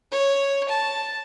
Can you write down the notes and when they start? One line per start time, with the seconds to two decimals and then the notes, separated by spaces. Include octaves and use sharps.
0.11 C#5
0.69 A5